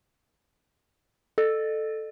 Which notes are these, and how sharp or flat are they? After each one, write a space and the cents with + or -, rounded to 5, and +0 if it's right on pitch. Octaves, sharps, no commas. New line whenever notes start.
A4 +0 D#5 -40